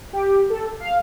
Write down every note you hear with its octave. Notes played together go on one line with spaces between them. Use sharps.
G4
A4
F5